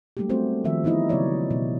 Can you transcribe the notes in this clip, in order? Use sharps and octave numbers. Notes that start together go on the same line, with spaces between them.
F#3 G3 A3 A#3 D4 G4
A3 B3 C4 F#4 C5
D#3 F3 E5
E3 B3 D#4 E4 D#5
C#3 F#3 B3 C#5 D5
B2